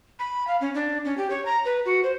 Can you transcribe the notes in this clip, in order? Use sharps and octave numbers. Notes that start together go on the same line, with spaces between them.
B5
F5
C#4
D4
C#4
G4
C#5
A#5
B4
F#4
C5